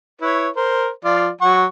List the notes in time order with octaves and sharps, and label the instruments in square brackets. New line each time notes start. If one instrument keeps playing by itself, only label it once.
[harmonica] E4 B4 C#5
A#4 C5
F3 F4 D5
F#3 F#5 C#6